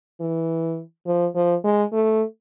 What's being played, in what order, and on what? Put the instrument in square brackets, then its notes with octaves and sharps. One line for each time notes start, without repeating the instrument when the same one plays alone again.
[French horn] E3
F3
F3
G#3
A3